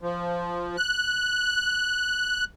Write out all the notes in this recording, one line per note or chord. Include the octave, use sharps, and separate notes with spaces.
F3
F#6